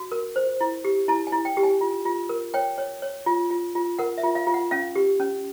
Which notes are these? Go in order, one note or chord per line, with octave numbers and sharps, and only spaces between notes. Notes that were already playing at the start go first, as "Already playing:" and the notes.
Already playing: F#4
A#4
C5
E4
G4
E4 A5
G#5
E4
G5
G4
G#5
F4
F4
A#4
C#5 G5
C#5
C#5
F4
F4
F4
A#4 F#5
E5
F4
F5
F4
F#5
C#4 F5
G4
C#4